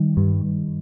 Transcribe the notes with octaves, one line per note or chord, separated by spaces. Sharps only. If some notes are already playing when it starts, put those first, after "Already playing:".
Already playing: D#3 G3
G2